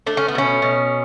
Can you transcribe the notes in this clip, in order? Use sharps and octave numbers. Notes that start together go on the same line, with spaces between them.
A3 D4
C#4
B3
B2 C#4
B2